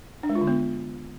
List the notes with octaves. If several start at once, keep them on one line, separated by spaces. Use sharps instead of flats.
D4
G#3
F4
D3
B3